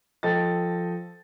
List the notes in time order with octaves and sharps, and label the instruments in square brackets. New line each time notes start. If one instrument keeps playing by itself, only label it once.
[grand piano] F3 A4 D#5 G5 A6